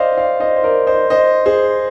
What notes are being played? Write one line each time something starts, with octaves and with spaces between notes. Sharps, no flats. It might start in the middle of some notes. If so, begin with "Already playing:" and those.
Already playing: C5 D5 D#5 F5
D5 F5
C5 D#5
C5
A#4 D5
C5 D#5
C5 D#5
G#4 C5